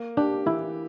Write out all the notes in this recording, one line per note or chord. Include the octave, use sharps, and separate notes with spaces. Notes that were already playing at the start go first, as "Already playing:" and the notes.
Already playing: A#3
D4 G4
E3 E4